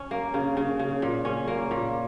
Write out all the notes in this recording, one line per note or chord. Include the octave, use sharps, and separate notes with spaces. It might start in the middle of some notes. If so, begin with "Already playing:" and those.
Already playing: C#4
A#3
C#3
C#3
C#3
A#2
C#4
A#3
A#2